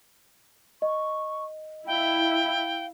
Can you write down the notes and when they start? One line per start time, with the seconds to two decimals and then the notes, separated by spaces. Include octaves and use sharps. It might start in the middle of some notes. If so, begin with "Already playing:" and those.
0.82 D#5 C#6
1.87 E4 F5 G5